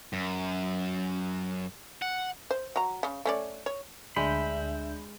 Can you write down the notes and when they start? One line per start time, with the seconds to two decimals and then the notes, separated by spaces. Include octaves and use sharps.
0.13 F#2
2.02 F#5
2.51 C5
2.76 F#3 A#5
3.03 C#3
3.25 A3 C#4 D5
3.66 C#5
4.16 D2 G#3 D4 E5 B5 G6